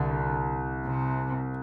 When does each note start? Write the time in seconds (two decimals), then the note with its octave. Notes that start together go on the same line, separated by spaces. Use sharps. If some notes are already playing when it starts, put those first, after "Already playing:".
Already playing: C2 D3
0.86 C3